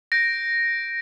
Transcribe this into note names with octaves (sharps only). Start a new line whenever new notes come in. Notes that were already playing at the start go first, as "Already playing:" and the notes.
G6 A#6 D7